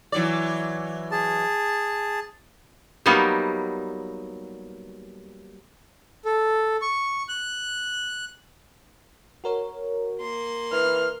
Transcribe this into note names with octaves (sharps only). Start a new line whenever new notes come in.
E3 F#3 D5
G#4 A5
F#3 G3 A#3 B3 D#4
A4
C#6
F#6
F#4 A#4 C#5
A#3 C6
E3 B5 F6